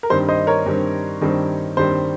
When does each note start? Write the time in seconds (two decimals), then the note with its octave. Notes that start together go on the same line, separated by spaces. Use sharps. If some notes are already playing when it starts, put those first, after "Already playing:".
0.03 A#4
0.10 G2 D#3 G3 C4 C5
0.29 C5 D#5
0.47 A#4 C#5
0.66 G2 D#3 G3 C4
1.21 G2 D#3 G3 C4
1.77 G2 D#3 G3 C4 C5